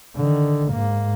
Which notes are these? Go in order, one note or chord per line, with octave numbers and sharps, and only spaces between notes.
D3 D#3
G#2 A#3